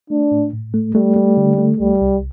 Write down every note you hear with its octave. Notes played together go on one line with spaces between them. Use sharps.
A3 D4
A2
A2
A3
G3 A3
A3
D3
A3
C2 G3
C2